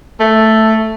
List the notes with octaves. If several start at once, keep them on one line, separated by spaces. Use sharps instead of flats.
A3